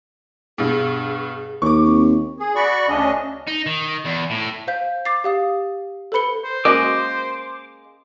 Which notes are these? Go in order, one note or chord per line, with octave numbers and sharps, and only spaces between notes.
G2 B2 G#4
D#2 C#6 D6
C4
G#4
F#4 D5 B5 C#6
D2 C#3 C#4 D4 D#5
D#4
D#3
E2
A2
C5 F5 G6 B6
D6 A6 C7
G4 F5 D#6
A4 B4 C5 B5 C#7 G7
C5
G#3 A#3 C#4 F#4 A#4 D#5 D6